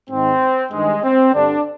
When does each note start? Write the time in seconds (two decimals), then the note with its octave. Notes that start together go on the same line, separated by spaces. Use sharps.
0.10 G#2 D#3 C4
0.72 G2 D#3 G#3
1.03 C4
1.33 G2 D3 D4